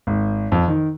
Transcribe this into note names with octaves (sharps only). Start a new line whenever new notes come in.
G#1
F2
D#3